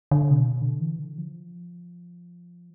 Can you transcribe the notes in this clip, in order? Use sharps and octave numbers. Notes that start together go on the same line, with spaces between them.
D3
C3
B2
D3
E3
D3
F3